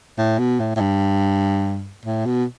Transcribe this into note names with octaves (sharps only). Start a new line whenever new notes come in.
A2
B2
A2
A2
G2
A2
B2